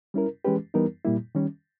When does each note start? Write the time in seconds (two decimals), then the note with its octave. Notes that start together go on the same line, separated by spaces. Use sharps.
0.14 G3 C#4 E4 A#4
0.45 E3 G#3 C#4 G4 B4
0.74 E3 G3 B3 D#4 A#4
1.05 A#2 G3 A#3 E4
1.35 D#3 G3 C#4